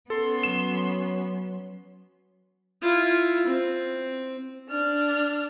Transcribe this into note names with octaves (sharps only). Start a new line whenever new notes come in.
B3 C#4 A4 C6
F#3 E7
E4 F4
C4
D4 F6